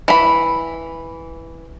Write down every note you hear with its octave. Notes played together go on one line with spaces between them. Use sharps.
E3 B5